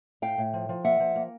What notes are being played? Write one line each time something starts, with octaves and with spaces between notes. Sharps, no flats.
A2 F5 G5
A2
F3
F3
A#3 E5 F#5
F3
A#3